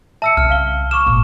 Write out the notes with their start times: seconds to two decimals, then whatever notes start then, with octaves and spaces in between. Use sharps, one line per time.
0.22 E5 A5 E6 C#7
0.37 C2 C#3 F6
0.50 F5 G7
0.91 C#6 D6 F6 E7
1.06 G#1 A#2